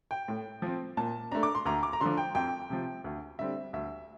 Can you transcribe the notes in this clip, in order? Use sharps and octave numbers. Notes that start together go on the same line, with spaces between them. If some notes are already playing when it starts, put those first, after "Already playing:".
G5
A2
F3 C4
A#2 A5
A3 D4 A#5
D6
C6
D2 A#5
D6
A#5
D3 F3 C6
G5
F2 G5
C3 F3
D2
D3 G3 C4 E5
D2 E5